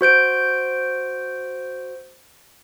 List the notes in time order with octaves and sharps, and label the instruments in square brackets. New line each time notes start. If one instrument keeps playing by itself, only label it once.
[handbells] F#4 C5 G6 D7